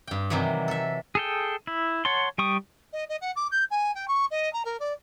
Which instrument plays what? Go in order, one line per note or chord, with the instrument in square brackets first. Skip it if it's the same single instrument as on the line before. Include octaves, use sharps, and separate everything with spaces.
[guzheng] G2 G5
C3 D#3 E3 F#3 G3
A4 E5
[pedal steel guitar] G#4 A4 G5
E4
C#5 F#5 A5 C6
G3 G5 C#6 D#6
[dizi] D#5
D#5
F#5
D6
G6
G#5
G5
C#6
D#5
A#5
A#4
D5